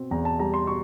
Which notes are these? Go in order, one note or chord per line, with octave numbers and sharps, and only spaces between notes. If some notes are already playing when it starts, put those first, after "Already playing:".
Already playing: B2 C4
E2 A#5
A5
G3 A#5
C6
B2 C#6